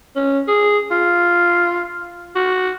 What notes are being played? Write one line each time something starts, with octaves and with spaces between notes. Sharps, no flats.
C#4
G#4
F4
F#4